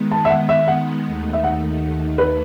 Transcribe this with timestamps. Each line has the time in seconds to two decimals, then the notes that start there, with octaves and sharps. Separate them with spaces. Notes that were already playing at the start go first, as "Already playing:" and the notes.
Already playing: D#3 G#3 B3
0.11 A5
0.25 E5
0.30 F#5
0.49 E5
0.68 F#5
1.05 D#2 D#3 A3
1.33 E5
1.44 F#5
2.18 B4